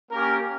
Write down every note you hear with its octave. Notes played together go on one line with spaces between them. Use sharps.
A#3 C#4 G4 A#4